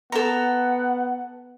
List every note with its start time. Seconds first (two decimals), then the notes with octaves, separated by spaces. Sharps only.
0.12 B3 A4 F#5 A#5